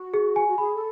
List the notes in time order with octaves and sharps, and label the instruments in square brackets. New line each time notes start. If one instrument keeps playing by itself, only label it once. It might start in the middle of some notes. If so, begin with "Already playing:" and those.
Already playing: [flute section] F#4
[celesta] G#4
G#5
[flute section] F#4
[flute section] G#4 [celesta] B5
[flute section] A4